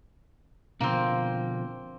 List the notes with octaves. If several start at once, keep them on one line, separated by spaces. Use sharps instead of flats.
B2 D3 F3 A#3 C4